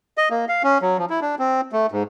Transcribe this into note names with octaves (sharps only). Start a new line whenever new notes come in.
D#5
A#3
F5
C#4
F#3
F3
E4
D4
C4
A3
G#2